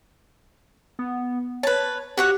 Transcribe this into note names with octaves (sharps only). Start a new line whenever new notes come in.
B3
B4 C#5 A5
F#4 G4 C#5 F#5